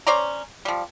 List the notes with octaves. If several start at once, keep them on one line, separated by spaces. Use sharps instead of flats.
C#4 C5 D5 A#5
F3 G3